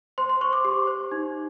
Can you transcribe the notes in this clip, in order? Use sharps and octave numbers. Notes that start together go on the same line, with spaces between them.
C5 C6
C6
C5 C#6
D6
G4
C5
D#4